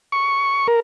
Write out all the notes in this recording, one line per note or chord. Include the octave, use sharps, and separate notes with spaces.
C#6
A#4